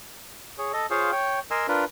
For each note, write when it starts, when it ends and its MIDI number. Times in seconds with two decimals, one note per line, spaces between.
0.58 0.72 68
0.58 0.72 73
0.73 0.86 69
0.73 0.86 75
0.91 1.11 65
0.91 1.11 68
0.91 1.11 72
0.91 1.11 73
0.91 1.11 77
1.12 1.40 73
1.12 1.40 79
1.51 1.67 70
1.51 1.67 75
1.51 1.67 80
1.51 1.67 84
1.51 1.67 88
1.68 1.85 62
1.68 1.85 65
1.68 1.85 70
1.68 1.85 71